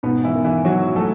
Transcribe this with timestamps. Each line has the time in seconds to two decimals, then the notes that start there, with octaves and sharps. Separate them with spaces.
0.03 G#2 B2 B3
0.24 E3 E4
0.35 D#3
0.44 E3 E4
0.65 G#2 F#3 F#4
0.96 F#3 A3 A4